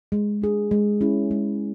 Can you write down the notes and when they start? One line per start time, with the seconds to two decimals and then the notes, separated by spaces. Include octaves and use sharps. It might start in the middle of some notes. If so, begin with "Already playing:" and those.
0.12 G#3
0.42 D4 G#4
0.71 G#3
1.01 C#4 E4 G#4
1.31 G#3